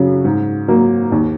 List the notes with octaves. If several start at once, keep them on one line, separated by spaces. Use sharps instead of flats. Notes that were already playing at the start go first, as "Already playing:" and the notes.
Already playing: F#2 C#3 F#3
G#2
F#3 A#3
D#2